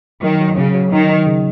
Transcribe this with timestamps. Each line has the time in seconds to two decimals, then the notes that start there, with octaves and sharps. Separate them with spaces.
0.23 D#3 F#3
0.41 F#3
0.57 C#3 F#3
0.75 F#3
0.92 D#3 D#4
1.09 D#4
1.26 C#3